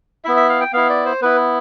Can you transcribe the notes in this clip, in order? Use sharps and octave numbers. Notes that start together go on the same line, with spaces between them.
B3 E4 E5
E5
F5
G5
B3 E4 F5
D5
C5
B3 E4 B4